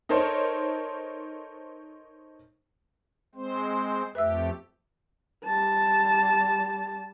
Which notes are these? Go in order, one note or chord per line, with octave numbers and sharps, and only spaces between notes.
D#4 A4 A#4 C5 C#5
G#3 C4 C5
F2 A3 G4 B4 E5 E6
G3 A5